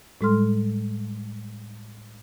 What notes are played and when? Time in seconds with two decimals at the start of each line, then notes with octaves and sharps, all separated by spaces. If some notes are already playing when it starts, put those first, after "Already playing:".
0.21 A2 G3 G#3 A4 C6 F6